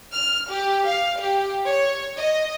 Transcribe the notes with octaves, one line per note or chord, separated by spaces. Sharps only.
F6
G4
F5
G4
C#5
D#5